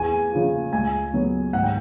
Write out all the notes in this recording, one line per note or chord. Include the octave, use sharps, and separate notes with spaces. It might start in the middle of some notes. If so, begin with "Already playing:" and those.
Already playing: E2 G#5
C#3 F3
C#2 G#5
C#3 F#3 B3
G#1 F#5
G5